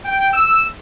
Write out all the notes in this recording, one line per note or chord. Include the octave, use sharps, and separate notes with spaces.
G5
E6